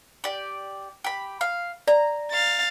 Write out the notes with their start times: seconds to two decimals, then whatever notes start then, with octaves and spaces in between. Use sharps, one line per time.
0.24 G4 D5
1.04 G4 B5
1.41 F5
1.87 D5 A#5
2.31 F5 A6